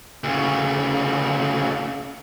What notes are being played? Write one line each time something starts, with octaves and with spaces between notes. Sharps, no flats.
D2 C#3